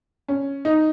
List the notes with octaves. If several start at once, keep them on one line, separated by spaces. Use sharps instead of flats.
C#4
D#4